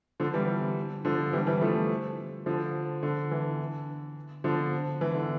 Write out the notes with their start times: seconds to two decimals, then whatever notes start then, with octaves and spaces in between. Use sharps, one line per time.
0.20 D3 F3
0.34 E3 G3
1.05 D3 F3
1.33 E3 G3
1.47 E3 G3
1.61 F3 A3
2.46 D3 F3
3.03 D3
3.31 E3
4.44 D3 F3
5.01 E3
5.15 D3